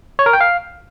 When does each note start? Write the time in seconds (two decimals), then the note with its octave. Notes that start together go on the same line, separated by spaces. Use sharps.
0.19 C#5
0.26 A#4
0.33 G5
0.41 F5